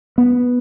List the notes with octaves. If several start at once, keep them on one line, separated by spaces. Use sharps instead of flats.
B3